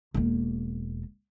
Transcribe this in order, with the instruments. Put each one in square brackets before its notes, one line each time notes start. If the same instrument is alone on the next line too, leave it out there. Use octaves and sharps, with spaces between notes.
[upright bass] E1 A#3